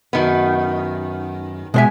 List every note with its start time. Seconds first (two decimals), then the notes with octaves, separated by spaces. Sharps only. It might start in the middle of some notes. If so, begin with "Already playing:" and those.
0.13 F#2 D#3 B3
1.74 B2 G#3 C5 E5 G#5